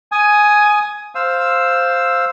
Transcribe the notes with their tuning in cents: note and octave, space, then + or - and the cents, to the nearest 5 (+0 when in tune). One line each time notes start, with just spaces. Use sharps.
G#5 +10 D#6 +0
C5 +0 F5 +0 E6 +0